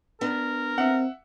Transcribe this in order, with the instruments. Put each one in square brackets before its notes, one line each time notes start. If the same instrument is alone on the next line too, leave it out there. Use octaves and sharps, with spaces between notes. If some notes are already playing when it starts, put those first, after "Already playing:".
[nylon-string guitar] B3 D4 [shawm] A#4
[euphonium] C4 [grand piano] E5 F#5